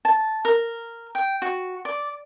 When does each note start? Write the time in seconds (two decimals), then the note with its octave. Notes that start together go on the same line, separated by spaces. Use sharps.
0.05 A5
0.45 A#4
1.15 G5
1.42 F#4
1.85 D5